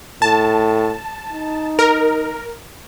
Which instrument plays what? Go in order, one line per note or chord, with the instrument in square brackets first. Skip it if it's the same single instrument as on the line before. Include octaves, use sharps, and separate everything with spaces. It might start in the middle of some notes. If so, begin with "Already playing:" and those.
[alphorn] A2 [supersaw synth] A5
[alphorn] D#4
[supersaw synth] A#4